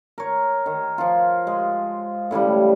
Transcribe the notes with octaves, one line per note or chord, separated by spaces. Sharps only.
A#4 C#5
D#3
F3 F4
G#3
A2 C#3 E3 G3